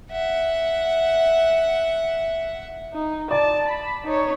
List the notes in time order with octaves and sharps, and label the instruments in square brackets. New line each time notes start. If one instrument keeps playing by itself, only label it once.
[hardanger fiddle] E5 F#5
[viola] D#4
[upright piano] D5 [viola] A5
[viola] B5
D#4 C#5